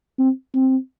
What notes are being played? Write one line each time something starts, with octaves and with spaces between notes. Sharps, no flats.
C4
C4